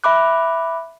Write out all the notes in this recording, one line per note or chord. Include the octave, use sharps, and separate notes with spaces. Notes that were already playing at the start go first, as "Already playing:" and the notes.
E5 B5 D6 F#6